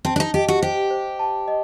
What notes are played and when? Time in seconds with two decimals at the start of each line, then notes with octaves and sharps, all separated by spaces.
0.05 C4 A5
0.16 D4
0.20 D#4
0.34 G4 D#5
0.48 F#4
0.62 G4 C5
0.90 C5
1.19 A5
1.48 D#5